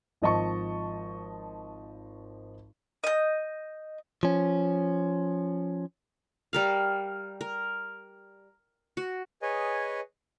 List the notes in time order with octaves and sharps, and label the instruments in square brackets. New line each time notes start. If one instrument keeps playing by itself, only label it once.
[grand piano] G#1 F3 D#5 A5 C#6
[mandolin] D#5 G6
[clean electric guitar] F3 C#4
[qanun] G3 A#4 F5
A#4
F#4
[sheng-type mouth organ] G#4 B4 C#5 D#5 G#5